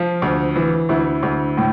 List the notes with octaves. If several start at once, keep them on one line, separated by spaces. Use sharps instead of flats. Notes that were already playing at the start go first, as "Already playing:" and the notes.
Already playing: F3 F4
D2
E3
D2 E4
D2
A2